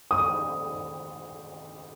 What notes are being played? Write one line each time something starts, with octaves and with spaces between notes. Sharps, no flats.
D#6